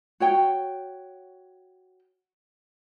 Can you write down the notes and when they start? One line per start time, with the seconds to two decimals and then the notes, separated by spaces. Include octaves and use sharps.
0.20 F#4 C#5 G5